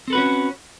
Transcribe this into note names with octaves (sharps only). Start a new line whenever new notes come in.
C4 C#4 F#4 A4 B4